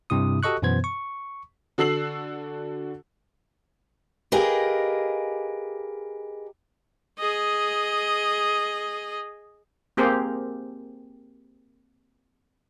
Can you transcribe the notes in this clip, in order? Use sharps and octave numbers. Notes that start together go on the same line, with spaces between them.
G2 C3 E4 D#6
F#4 G4 A4 D#5 C#6 F#6
F#2 B2 E3 B3 C5 G#6
C#6
D3 F#4 A4 E6 C7 F#7
G4 G#4 A#4 B4 D#5 F5
G#4 D#5
A#3 C4 G4 G#4 A#4 C5